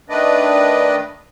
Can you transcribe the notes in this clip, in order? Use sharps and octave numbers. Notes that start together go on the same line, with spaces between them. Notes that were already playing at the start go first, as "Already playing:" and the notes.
D#3 A3 D4 B4 D5 D#5